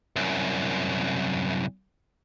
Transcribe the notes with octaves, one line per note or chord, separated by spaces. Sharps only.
C2 F#2